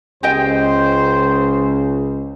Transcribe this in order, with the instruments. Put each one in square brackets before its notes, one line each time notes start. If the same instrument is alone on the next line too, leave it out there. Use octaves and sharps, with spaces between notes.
[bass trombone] C#2 [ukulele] G4 D#5 G5 [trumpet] C5